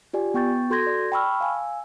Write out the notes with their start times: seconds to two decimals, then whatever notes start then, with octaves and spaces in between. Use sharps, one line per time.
0.13 F4 G4 D5 G#5
0.34 B3 G5 C#6 G6 A6
0.70 F#4 A4 C6 G6 G#6 A#6
0.87 D5
1.12 G5 A5 B5 C#6 E6 F6
1.41 F5 G#5 E6